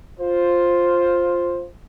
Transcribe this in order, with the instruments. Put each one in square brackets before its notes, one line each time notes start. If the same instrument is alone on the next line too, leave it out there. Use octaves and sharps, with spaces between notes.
[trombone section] F4 C5